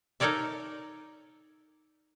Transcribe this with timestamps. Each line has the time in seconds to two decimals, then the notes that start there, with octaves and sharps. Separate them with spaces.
0.20 D#4 A4 A#4 C#5 D5 E5